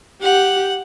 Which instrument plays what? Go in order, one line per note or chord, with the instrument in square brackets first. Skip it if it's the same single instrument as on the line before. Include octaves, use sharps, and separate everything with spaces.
[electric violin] G4 [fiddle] F#5